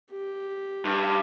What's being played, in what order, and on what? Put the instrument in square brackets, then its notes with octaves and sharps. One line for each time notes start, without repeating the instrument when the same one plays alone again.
[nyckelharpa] G4
[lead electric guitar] G2